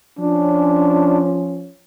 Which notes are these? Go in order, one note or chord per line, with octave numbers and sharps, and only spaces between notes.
F3 C#4 D4